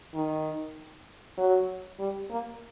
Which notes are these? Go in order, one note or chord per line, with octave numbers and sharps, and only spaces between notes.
D#3
F#3
G3
A#3